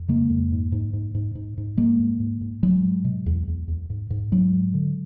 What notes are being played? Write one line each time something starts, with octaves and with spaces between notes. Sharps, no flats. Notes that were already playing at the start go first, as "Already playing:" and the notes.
Already playing: F2
C#3 G#3 A#3
F2
G#2
G#2
G#2
G#2
G#2
G#2
G#2 G#3 A#3
G#2
G#2
G#2
G#2 F#3 G#3
G#2
B2
E2
E2
E2
G#2
G#2
G#2 F#3 G#3
G#2
D3